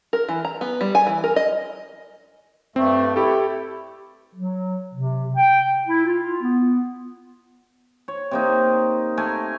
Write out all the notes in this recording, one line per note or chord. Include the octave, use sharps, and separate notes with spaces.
A#4
E3
A#5
B3
G3
G#5
E3
A#4
D#5
G2 A3 C4
E4 G4 A4
F#3
C3
G5
E4
F4
B3
C#5
C3 A#3 D#4
A3 A#4 G#5